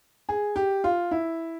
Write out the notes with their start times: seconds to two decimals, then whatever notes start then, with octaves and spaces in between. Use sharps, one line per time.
0.29 G#4
0.56 G4
0.84 F4
1.11 E4